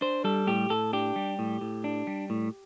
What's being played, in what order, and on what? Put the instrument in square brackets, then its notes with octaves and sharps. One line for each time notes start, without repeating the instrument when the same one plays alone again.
[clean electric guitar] D4 C5
G3 A4
A2 G4
A2 A4
D4 G4
G3
A2
A2
D4
G3
A2